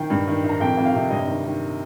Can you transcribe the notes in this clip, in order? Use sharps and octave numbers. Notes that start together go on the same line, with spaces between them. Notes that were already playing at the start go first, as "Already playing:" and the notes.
Already playing: D#3 G5
G2
D#3
D#3
A#5
F2 G5
F2
F5
C3
G2 D#5
D#3
D#3